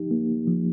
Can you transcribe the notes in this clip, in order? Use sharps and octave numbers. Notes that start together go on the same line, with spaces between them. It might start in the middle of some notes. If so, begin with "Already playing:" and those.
Already playing: F3 D#4 G4
A#3
F3